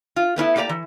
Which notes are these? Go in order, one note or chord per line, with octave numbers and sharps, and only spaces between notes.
F4
A3 B3 C#4 E4
A3 A#3 G4 D5 A#5
E3